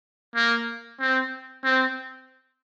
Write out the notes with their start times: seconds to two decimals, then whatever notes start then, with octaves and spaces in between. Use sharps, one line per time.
0.35 A#3
1.00 C4
1.64 C4